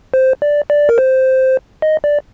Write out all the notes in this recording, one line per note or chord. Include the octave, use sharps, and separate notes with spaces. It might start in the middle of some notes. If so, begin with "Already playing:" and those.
C5
D5
D5
A#4
C5
D#5
D5